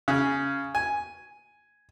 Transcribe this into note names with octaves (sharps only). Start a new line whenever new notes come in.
C#3
G#5